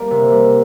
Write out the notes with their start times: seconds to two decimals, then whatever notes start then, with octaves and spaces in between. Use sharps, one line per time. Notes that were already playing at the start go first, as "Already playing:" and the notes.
Already playing: G3 A#3
0.11 C3
0.32 G3